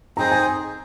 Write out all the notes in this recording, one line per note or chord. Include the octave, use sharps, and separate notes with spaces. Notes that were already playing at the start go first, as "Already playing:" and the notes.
C4 D#4 G#4 C5 A#5
G#5